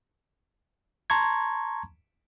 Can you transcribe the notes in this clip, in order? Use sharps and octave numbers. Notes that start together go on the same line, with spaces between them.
A5 A#5 C6 C#6 G#6